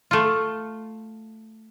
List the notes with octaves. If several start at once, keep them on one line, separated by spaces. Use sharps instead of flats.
A3 F4